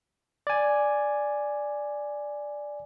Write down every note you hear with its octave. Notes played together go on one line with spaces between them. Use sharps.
D5 G#5